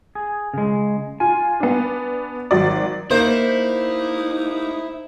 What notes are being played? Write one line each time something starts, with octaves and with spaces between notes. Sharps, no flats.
G#4
C#3 G#3
F4 G#5
B3 D4
G#1 F#3 D5
A#3 D#4 E4 C5